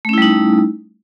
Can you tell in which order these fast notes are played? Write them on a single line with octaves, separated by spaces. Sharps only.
A3 C#4 E4 G3 D#4